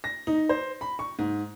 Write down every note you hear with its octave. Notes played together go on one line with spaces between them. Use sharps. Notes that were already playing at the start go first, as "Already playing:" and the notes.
A#6
D#4
C5
B5
C#6
G#2